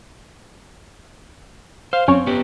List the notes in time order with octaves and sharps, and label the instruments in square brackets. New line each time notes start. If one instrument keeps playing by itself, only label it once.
[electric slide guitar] C5 [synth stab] F5
[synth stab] F#2 C#4 C#5 [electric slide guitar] C4
[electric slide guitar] B3 G4